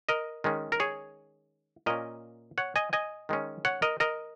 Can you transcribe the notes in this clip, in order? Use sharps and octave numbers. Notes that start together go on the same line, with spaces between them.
A#4 D#5
D#3 G#3 C#4
A#4
G#4 C#5
A#2 A#3 C#4 A#4 D#5
C#5 F#5
D#5 G#5
D#5 G#5
D#3 G#3 C#4
C#5 F#5
A#4 D#5
A#4 D#5